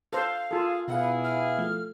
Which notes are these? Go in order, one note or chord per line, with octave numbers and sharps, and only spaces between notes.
A4 C5 F5
F4 G#4 A4
B2 B3 E4 G#4 F5 F#5
F6
F3 A3